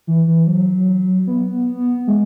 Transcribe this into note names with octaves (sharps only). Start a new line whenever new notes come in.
E3
E3
F#3
B3
G#3